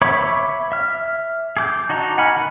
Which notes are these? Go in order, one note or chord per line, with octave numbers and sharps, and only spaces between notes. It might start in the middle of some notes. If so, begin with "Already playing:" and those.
C#5 E5 B5 C#6 D6
E5 F6
G#4 D6 G6
D#4 F#4 D#5 A5 A#5
F#5 G#5 B5 F6
D#3 F#5